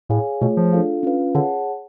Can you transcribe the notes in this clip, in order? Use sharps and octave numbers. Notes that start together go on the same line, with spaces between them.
A2 G#4 C#5 F5 G#5
B2 A3 F4 G#4 C#5
F3
D4 F4 A4 F5
C#4 F4 B4 F5
D3 G#4 C#5 F#5 A5